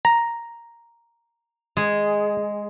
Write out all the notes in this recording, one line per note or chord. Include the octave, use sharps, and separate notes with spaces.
A#5
G#3 G#4